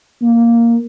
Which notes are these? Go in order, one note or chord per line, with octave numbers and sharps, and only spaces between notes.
A#3